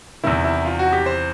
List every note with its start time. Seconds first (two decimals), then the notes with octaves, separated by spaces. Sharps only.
0.24 E2 C3 D#3 E4
0.44 E4
0.65 F4
0.79 F#4
0.92 G4
1.06 C5